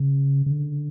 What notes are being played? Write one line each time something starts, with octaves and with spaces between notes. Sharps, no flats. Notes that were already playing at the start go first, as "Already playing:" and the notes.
Already playing: C#3
C#3
D3